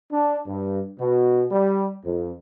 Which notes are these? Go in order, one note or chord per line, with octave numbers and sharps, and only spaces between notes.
D4
G2
B2
G3
F2